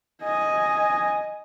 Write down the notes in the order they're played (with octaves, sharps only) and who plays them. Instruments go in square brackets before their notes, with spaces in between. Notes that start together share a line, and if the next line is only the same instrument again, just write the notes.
[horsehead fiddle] D#5 G#5